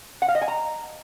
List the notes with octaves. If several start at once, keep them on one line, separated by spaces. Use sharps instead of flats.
F#5
F5
D#5
G#5
A#5